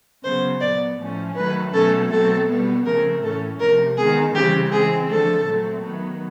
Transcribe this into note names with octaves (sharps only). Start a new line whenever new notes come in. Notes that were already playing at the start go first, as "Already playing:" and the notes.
C#3 F#3 B3 C5
A#2 F#3 B3 D5
A2 F3 A3 C#4
D#3 F#3 A3 B4
B2 F#3 A3 C#4 A4
B2 F#3 A3 C4 A4
B2 G3 B3
C#3 F3 A3 C4 A#4
A2 E3 A3 C#4 A4
C3 F3 A3 A#4
D#3 G#3 B3 G#4
C#3 E3 G3 C4 G4
E3 G#3 C4 G#4
D3 F3 A3 A4
A#2 F#3 A3 C4
D#3 F#3 B3